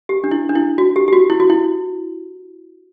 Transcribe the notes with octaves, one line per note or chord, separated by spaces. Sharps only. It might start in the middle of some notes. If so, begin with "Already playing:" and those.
G4
D4
E4
D4
E4
F#4
G4
G4
F#4
E4
F#4
E4